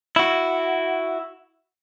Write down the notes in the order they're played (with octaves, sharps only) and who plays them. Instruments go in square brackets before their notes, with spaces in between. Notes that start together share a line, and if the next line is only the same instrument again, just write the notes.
[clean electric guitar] E4 F#4